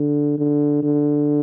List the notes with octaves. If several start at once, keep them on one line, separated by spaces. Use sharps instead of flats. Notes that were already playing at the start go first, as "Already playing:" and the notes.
Already playing: D3
D3
D3